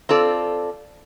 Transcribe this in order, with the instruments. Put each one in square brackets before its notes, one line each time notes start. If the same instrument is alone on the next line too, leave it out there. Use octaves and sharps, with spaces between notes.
[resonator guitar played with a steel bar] C4 F4 A4 D5